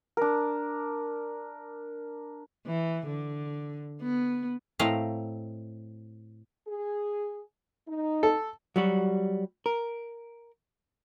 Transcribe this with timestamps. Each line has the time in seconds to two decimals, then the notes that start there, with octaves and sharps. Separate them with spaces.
0.17 D4 A#4
2.67 E3
3.07 D3
4.02 B3
4.79 A2 A3 C4 D#5 F5 A#5
6.67 G#4
7.87 D#4
8.23 A4
8.76 F#3 G3 F#4
9.66 A#4